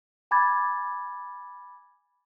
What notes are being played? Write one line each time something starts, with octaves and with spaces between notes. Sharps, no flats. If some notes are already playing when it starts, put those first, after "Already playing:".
G#5 B5 D6 G#6 A6